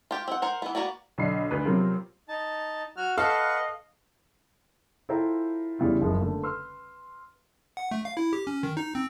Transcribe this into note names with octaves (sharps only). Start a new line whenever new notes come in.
F4 G4
C4 F#5
A#4 C5 F#5
E3 B3
A#3 B3 F#4 D5
B1 D3 D4 B5 C7
D2 B4
C3 F3 F#3 B3 C4 A#4
D#4 A5
F#4 F6
A4 B4 D#5 F5 F#5 C#6
E4 F4 A4 C5 G5 A#5
E2 C#3 G3 E4 F4
F#1 F3 G#3
D3 A3 A#3
B4 C6 E6 F6
F#5
A3
F5
E4
G4
C#4
D#3
D#4
C4